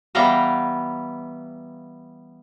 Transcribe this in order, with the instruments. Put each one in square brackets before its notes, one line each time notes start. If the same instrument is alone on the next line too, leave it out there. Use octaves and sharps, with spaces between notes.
[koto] E3 G3 B3 F5 G5 A#5